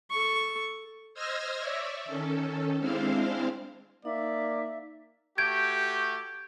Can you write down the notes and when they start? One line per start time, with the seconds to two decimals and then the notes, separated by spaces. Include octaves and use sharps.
0.10 A4 C#6
1.14 C5 D#5 E6 F6 G#6 A#6
1.59 C#5 D5 E5
2.05 D#3 C#4 A4
2.79 G#3 C4 D4 E4 C5 F5
4.05 A#3 D#4 D5 E5
5.38 A3 F#4 G4 G6 G#6 D7